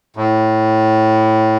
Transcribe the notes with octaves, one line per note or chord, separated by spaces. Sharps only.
A2